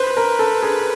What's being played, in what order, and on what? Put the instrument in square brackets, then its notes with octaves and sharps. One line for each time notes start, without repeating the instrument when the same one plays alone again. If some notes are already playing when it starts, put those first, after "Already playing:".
Already playing: [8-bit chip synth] B4 [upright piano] C5
[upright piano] A#4
A4
G#4